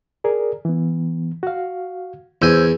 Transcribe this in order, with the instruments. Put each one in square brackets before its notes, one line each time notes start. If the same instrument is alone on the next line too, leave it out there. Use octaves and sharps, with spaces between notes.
[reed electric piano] G#4 A#4 D5
E3 B3
F#4 F5
[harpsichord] E2 G#5 [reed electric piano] C5 E6 G6